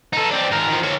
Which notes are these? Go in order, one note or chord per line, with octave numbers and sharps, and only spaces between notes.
D#4 A4
C4 D4
G#2 A#4
D#3 F3
A#3 C#5